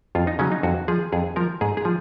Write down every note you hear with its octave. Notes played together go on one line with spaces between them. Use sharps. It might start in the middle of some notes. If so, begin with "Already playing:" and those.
F2 F4
D#4
C#3 F#3 C#4
D#4
F2 F#4
F3 G#4
F2 G#4
F3 A#4
G#2 G#4
G#4
F3